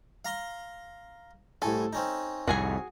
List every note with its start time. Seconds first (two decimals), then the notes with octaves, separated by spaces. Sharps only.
0.25 F5 A#5 C6
1.62 C2 A2 A4 G#5
1.93 C4 C#4 D#4
2.47 C2 F2 A2 F#4 G#4 G#5